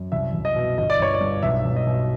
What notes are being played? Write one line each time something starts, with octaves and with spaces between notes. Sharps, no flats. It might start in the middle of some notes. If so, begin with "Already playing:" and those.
Already playing: F#2
C2 E5
C2
D#5
B2
G1 D#5
D5
G1 C#5
D5
G2
B1 E5
B1
D#5
B2